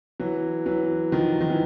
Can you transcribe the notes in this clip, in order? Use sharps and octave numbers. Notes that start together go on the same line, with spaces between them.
E3 F#3
E3 F#3
D#3 F3
D#3
E3